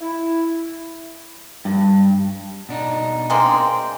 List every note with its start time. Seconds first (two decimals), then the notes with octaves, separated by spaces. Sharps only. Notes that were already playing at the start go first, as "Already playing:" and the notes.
0.01 E4
1.65 G2
2.69 B2 D4 D#4
3.30 G#3 A#3 C4